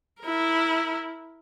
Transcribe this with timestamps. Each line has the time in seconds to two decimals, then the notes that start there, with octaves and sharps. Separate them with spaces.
0.22 E4 A#4